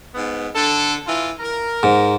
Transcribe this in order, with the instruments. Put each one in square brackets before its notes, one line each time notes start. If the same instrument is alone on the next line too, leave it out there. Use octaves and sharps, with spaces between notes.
[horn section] G#2 B3
D3 A4
E3 F4
A#4
[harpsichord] G#2